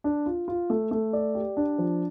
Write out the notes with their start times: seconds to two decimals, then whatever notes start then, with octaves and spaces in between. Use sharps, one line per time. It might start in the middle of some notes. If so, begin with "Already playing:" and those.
0.04 D4
0.26 F4
0.48 F4
0.70 A3
0.91 A3
1.13 D5
1.35 G4
1.57 D4
1.78 F3